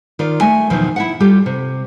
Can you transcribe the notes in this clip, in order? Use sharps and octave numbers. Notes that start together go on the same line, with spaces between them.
D#3 F4 D5
A3 E5 G#5
E2 B2 D#3 F3 F#3
E4 E5 F#5
G3 F4 G4 A4
C3